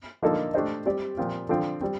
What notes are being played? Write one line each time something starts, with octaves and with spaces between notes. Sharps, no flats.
D3 F3 A#3 D#4 A4
A3 D4 G4 C5 D#5
G3 C4 G4 D5
A#2 F3 C4 F4
D3 F3 C4 F4
G3 C4